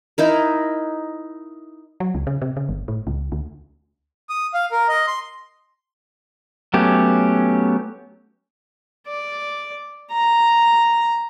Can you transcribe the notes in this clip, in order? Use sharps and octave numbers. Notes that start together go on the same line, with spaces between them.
D#4 E4 A#4
F#3
C#2
C#3
C3
C#3
G1
A2
C#2
D2
D#6
F5
A#4
D#5
C6
F#3 A3 B3 C#4 G4
D5
A#5